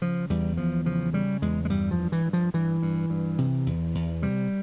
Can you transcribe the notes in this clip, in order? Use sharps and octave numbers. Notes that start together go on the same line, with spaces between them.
C#3 F3
E2 G3
E2 F3
C#3 F3
C#3 G3
E2 G#3
G#3
G2 G3
F3
G2
E3
G2
F3
G2 E3
G2
G2
C3
E2
E2
C3 G3